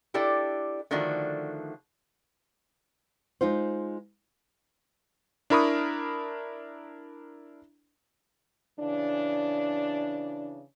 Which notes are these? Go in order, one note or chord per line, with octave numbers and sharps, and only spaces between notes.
D4 E4 G4 A4 D5
D3 D#3 F3 A3 D4 F#4
G#3 D#4 F4 C5
D4 E4 A#4 B5 C#6 D#6
C#3 E3 D4